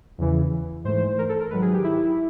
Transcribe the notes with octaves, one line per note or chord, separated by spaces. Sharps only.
E2 C#3 E3
G#2 E3 A3 C5
A#4
A4
A#4
G#2 D#3 F#3 B4
G#4
G4
E4